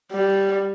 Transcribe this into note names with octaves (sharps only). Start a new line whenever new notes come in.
G3